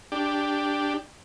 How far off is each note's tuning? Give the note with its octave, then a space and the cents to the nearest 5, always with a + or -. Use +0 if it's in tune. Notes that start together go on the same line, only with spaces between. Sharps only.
D4 +0 G4 +5